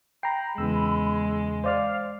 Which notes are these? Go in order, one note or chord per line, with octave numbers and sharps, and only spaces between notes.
G5 A#5 B5 C7
E2 C#3 E3 G#3 E6
C5 D5 F5 F6